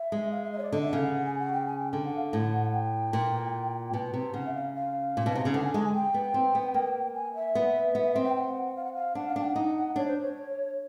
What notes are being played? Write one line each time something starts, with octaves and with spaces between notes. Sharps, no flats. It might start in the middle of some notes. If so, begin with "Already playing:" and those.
Already playing: E5
G#3
F5
E5
D#5
C#5
D5
D3 D#5
E5
C#3 F5
F#5
G#5
F#5
G5
G#5
G5
D3 G5
F#5
F5
A2 F#5
G5
A#2
B2
C3
C#3 F#5
E5
F5
F5
A#2
B2
C3
C#3
D3 F#5
G#5
G#3 A5
G#5
G5
B3
C4
B3
A#3
G#5
E5
B3
B3
C4
G5
G5
F#5
F5
F#5
F5
D4 F#5
F5
D4
G5
F#5
D#4
D4 C#5
C5
C#5